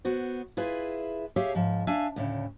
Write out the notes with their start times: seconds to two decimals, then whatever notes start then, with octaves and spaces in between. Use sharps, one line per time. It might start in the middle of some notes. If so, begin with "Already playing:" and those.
0.05 B3 F#4 C5
0.57 E4 F4 G#4 B4
1.36 G4 G#4 C#5 E5 F5
1.55 G#2 F3
1.87 D4 E5 F5 G#5
2.16 D2 A2 C#3